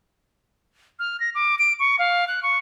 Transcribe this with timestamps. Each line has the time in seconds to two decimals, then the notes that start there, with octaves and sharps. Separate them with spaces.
0.99 F6
1.20 A#6
1.35 D6
1.59 D7
1.80 C#6
1.99 F5
2.28 F#6
2.43 C#6